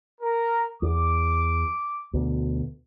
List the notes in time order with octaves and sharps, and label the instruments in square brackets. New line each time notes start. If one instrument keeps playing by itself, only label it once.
[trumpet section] A#4
[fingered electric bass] E2 [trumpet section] D6
[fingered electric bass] D2 B2